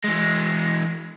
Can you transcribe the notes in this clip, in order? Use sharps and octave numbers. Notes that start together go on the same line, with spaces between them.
E3 G#3